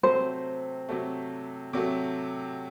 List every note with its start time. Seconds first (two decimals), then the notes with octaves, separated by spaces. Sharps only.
0.03 C3 F#3 A3 C5
0.89 C3 F#3 A3
1.73 C3 F#3 A3